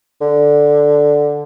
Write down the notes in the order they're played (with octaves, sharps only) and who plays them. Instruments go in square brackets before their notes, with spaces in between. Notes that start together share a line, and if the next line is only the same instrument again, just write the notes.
[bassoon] D3